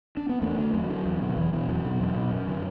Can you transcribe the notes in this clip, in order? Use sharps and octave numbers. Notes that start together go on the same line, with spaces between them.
D4
B3
E2 A3
D3
E2 F#3
D3
E2
B2
D3
E2 E3
B2 E3
E2 F#3
B2
E2
B2
F#2
D3